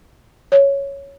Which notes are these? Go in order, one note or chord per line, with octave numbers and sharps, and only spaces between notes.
C#5